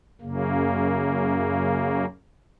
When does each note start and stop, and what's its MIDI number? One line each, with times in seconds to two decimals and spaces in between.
0.21 2.05 42
0.21 2.05 49
0.21 2.05 58